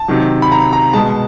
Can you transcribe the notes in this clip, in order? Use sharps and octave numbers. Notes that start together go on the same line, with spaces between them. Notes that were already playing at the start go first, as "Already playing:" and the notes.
Already playing: A5
C3 D#3 F#3
B5
A#5
A#5
B2 G#3 A5